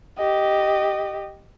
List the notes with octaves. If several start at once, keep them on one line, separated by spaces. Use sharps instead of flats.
G4 D#5